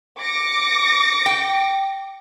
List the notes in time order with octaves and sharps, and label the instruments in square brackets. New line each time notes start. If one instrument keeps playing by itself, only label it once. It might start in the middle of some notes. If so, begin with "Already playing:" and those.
[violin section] D6 A#6 C#7
[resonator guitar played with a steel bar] G5